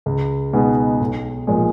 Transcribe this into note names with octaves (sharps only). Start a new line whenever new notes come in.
C#2
B2 G#3 B3 D#4
B1
A#2 F3 G#3